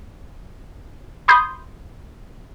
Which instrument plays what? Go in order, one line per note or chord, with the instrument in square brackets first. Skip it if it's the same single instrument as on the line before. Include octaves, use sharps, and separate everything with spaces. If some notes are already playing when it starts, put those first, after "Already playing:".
[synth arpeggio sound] B5 C6 D#6 G6